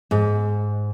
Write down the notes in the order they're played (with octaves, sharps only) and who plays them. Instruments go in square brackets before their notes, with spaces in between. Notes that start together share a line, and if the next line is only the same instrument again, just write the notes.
[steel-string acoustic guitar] G#2